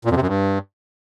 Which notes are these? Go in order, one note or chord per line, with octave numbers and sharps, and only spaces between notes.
A#2
F2
C3
F#2
G2